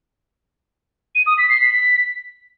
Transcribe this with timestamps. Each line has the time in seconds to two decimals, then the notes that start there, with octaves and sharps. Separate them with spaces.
1.15 D#7
1.26 D#6
1.38 B6
1.49 C7
1.60 B6